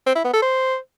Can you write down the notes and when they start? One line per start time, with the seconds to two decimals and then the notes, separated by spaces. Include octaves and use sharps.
0.06 C4
0.15 E4
0.24 B3
0.33 A4
0.42 C5